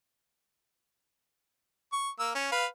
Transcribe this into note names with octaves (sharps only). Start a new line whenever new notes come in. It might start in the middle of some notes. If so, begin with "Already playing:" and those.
C#6
A#3 E6
C#4
B4 F5